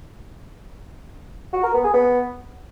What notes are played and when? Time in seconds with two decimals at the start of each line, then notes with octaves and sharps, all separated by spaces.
1.53 F#4
1.63 A#4
1.74 B3
1.84 G#4
1.94 B3